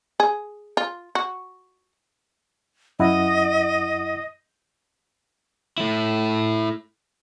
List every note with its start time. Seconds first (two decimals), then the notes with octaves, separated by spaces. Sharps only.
0.20 G#4
0.77 F4
1.15 F#4
2.99 F#2 E4 D#5 F#5
5.78 A3 E4